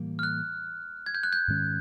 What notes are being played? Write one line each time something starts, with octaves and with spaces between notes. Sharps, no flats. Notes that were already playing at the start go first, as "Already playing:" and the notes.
Already playing: A2 E3 G3 A#3
F6
F#6
G#6
G6
F#6
G6
G#2 D#3 G#3 C#4